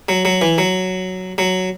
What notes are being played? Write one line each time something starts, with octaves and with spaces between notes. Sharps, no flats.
F#3
F#3
E3
F#3
F#3